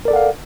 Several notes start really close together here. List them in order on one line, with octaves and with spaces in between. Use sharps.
A#4 D5 A4 F#5 F5